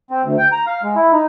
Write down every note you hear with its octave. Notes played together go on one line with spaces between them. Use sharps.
C4
D2
G5
A#5
F5
G#3
E4
D#4